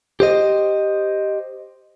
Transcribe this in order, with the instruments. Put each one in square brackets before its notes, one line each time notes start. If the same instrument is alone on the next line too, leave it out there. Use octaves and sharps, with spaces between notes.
[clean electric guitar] G4 C5 D#5